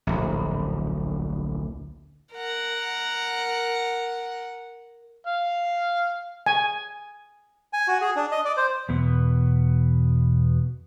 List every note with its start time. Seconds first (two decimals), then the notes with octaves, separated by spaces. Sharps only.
0.07 D1 A#1
2.34 A#4 F#5
5.27 F5
6.46 G#5
7.73 G#5
7.88 F#4
8.01 G#4
8.16 D4
8.32 D#5
8.45 D5
8.57 C5
8.89 E2 B2 B3